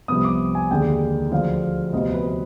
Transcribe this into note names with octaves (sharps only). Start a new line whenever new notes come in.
C2 C3 F3 B3 D#6
D6
G#5
D#2 D3 G#3 G5
D2 D3 F3 G#3 F5
D2 C3 F3 B3 D#5
B4